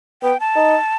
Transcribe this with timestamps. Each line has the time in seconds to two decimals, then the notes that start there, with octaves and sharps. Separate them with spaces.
0.23 B3 G5
0.40 A5
0.56 D#4